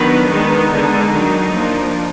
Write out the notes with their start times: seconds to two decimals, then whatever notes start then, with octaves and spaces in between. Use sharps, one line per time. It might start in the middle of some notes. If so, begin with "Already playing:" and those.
Already playing: D#3 F#3 B3 D4 B4
0.29 D#3 G#3 B3 D4 D#4
0.71 D3 G#3 D4 D#4
1.12 D#3 F#3 D4
1.54 F3 A#3 D4